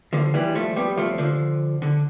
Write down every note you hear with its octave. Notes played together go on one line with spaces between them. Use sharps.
D3 F3
E3 G3
F3 A3
G3 B3
F3 A3
D3 F3
D3